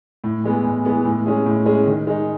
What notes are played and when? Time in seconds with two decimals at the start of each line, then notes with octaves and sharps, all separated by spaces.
0.24 A2
0.44 E3 G#3 B3
0.64 A2
0.85 E3 G#3 B3
1.05 A2
1.26 G#3 C#4 G#4
1.46 A2
1.66 G#3 C#4 G#4
1.86 D#3
2.07 G#3 D#4